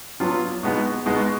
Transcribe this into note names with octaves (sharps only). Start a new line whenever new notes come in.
F#3 B3 D4 F4
B2 G#3 B3 D#4 F#4
B2 G#3 B3 D#4 F#4